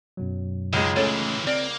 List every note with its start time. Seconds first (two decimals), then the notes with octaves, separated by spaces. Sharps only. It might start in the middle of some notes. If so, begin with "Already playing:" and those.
0.17 F#2 B2 F#3
0.73 C#2 D#3 G#3
0.97 D#3 E3 A3 C#4 A4 C#5
1.47 A#3 C4 D5